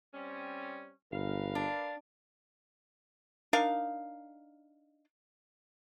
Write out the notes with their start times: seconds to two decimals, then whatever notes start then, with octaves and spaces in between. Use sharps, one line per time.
0.14 G3 C4 C#4
1.12 G1 A#4 B4 F5
1.55 D4
3.53 D4 D#4 A#4 F5